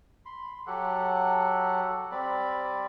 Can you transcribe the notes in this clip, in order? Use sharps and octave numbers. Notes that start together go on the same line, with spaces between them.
B5 C6
F#3 G4 A4 F#5
G3 C4 D5 B5